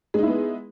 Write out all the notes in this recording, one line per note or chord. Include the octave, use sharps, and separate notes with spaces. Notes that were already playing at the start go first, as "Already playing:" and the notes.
G#3 B3 D#4 E4